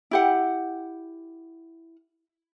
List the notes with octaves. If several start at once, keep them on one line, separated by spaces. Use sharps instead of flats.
E4 G4 F#5